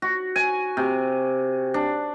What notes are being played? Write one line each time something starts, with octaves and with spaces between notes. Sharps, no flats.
F#4
G#5
C3
D4